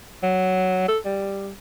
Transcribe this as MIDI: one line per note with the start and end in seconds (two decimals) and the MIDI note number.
0.23 0.87 54
0.88 0.98 69
1.05 1.51 55